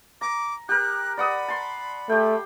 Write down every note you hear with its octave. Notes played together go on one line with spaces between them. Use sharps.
A#5 D6
G4 A#4 F#6
D5 F#5 B5 D#6
A5 C6
A3 G4 G5